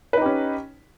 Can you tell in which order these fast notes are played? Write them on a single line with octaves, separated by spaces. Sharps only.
B4 D#4 G4 C#4